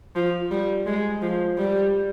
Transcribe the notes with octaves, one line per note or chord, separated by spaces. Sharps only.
F3
G3
G#3
F3
G3